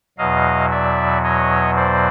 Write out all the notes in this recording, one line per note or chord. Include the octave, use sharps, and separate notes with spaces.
E2 B2 F#3 D#5 F5
D5 E5
C#5 D#5
C5 D5